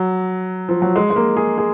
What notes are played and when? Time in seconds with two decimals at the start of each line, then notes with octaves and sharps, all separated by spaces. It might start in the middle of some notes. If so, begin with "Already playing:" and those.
Already playing: F#3
0.69 F3
0.82 F#3
0.96 G#3
1.10 G#3
1.16 A#3
1.37 G#4
1.58 G#4